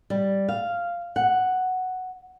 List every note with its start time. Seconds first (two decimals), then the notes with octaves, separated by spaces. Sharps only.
0.10 G3
0.49 F5
1.16 F#5